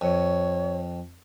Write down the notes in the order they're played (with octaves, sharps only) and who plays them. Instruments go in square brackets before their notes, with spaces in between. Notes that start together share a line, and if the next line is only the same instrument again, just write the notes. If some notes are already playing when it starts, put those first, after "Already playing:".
[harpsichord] F2 [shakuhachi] C#5